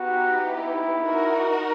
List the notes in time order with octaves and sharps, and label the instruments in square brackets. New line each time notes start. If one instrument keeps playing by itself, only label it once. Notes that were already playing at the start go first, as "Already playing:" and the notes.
Already playing: [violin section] B3 D#4 G4 [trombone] F#4
[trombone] E4
[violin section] D#4 F#4 A#4